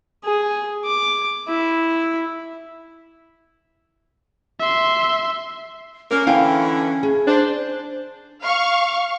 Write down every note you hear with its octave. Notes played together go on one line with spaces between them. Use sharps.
G#4
D6
E4
E5 C6
A#3 C#4 A#4
D3 E3 E4 F5 G5 G#5
G#4
D4 C5
F5 C#6